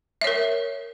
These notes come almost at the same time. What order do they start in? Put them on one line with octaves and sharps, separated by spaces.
E5 C#5 A#4